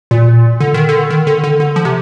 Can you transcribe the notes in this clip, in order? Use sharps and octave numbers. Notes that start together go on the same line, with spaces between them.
A#2
D3
D#3
D3
D#3
D3
D3
D3
F3
C3